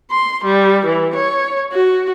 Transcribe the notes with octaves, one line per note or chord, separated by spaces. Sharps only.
C6
G3
E3
C#5
F#4